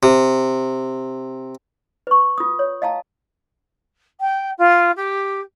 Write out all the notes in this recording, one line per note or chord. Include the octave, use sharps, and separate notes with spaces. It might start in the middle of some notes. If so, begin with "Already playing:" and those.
C3
B4 C#6
F4 D#6
C#5
D#5 F5 A5 A#5
G5
F4
G4